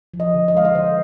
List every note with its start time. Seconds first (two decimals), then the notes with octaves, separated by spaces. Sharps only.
0.14 F3
0.20 D#5
0.34 D3
0.48 D#5
0.54 G#3 F5
0.65 D#5
0.75 D3 C5